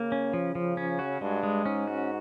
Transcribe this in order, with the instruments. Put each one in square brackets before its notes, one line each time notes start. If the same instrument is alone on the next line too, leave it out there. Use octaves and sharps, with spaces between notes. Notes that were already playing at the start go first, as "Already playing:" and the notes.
Already playing: [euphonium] C#3 [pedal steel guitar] A#3
[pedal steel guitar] C#4
F3
F3
C#4
F#4
[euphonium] G2 [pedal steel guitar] G#3
[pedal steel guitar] G#3
[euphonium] G#2 [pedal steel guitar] C#4
[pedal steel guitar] F#4